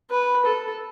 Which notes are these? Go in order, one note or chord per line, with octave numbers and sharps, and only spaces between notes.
B4
A4